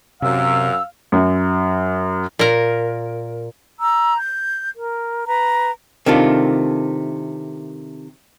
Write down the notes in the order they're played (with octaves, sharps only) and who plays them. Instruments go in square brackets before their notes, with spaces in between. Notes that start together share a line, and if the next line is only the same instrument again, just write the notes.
[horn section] F#2 [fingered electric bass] C3 [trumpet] F5 [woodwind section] E6
[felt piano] F#2
[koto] A#2 A#4
[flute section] A#5 B5 E6
G6
A#4
B4 A#5 B5
[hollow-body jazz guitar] C3 D#3 A3 D4 F4